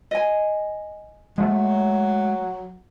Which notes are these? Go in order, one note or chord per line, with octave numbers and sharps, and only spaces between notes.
D#5 G#5
F#3 G#3 A3